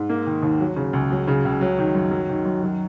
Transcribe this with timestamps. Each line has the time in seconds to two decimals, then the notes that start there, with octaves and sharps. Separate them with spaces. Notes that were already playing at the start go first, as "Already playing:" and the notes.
Already playing: G#2
0.10 A#3
0.27 D#3
0.43 D#2
0.60 F#3
0.76 C#3
0.93 C#2
1.11 F#3
1.28 C#3
1.45 C#2
1.61 F#3
1.79 D#3
1.95 F#2
2.12 F#3
2.29 D#3
2.45 F#2
2.63 F#3